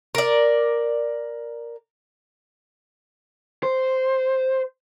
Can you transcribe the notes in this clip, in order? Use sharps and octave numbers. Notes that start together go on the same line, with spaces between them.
A#4 D5
C5